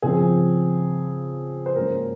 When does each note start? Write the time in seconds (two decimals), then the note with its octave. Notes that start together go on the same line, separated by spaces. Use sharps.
0.02 C#3 F3 C4 G#4
1.66 C5
1.75 G#2 F#3 A#3 C#4 A#4